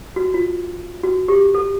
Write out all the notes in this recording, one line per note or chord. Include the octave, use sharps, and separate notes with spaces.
F#4
F4
F#4
G4
A4